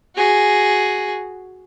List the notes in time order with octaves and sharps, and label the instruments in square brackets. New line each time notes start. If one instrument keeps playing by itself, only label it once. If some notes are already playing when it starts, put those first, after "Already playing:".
[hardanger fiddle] F#4 G#4